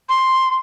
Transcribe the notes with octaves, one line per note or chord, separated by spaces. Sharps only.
C6